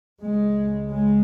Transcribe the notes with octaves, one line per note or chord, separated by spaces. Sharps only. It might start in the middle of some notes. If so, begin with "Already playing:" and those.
C#2 C#3 G#3
G#3